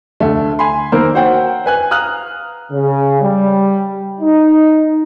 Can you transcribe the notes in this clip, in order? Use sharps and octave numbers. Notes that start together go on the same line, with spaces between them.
D2 A3
G#5 B5 C6
D#3 A#3 A#4 C5 E6
F#4 C5 C#5 F#5 G5
B4 G#5 F#6
F5 A#5 D#6 F6 F#6
C#3
G3
D#4